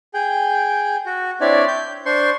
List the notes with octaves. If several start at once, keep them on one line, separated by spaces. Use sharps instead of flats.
G#4 G5
F#4
C4 D4 E4 C#5 D5
G6
D4 C5 C6 C#6